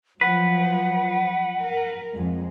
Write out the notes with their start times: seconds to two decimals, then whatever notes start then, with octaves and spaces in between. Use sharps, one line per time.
0.21 F3 F#3 B4 F#5
1.61 A#4
2.14 F2 G#3